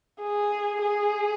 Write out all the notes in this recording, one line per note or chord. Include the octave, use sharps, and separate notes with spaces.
G#4
G#4